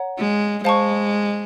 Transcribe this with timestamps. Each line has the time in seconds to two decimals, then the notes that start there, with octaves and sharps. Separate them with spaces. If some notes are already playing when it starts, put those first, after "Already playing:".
Already playing: C#5 F#5 A#5
0.19 G#3
0.64 G#3 C5 F5 A5 C#6